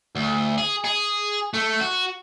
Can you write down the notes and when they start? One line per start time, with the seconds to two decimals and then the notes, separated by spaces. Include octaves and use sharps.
0.15 D2
0.58 G#4
0.84 G#4
1.54 A3
1.80 F#4